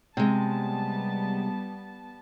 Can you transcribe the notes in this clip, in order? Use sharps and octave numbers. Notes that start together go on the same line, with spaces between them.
C3 G3 G#3 B3 A5